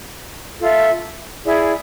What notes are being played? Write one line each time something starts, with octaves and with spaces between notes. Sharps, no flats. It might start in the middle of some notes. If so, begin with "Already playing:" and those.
F4 A4 E5
E4 G#4 D5